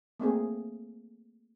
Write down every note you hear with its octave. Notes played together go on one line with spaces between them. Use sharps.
A3 A#3 C4 G#4